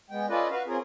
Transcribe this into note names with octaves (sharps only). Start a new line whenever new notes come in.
G#3 B3 G5
C#4 F4 A4 B4 D5 D#5
F#4 B4 F5
C4 C#4 F4 G#4 A#4